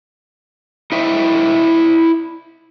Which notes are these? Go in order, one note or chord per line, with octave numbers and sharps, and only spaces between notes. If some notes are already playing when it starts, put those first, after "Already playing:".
E4 C5 D#5 E5 G5